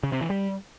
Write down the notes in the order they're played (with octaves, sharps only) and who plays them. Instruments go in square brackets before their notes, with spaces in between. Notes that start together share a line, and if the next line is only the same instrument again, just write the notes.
[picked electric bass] C#3
C3
E3
G3